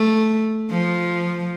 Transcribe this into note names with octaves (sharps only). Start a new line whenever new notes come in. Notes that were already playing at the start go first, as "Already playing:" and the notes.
Already playing: A3
F3